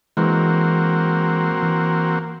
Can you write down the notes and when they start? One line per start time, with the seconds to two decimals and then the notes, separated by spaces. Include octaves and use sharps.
0.17 E3 G#3 A#3 C4 F#4
1.63 E3